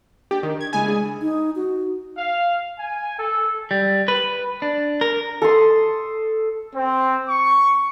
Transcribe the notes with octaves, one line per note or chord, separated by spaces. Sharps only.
D4 G4
D#3
G#6
C#3 G#3 E4 G#5
D4 G#4
D#4
F#4
F5
G#5
A4
G3
B4
D4
A#4
A4 A5 C6 D#6
C4
C#6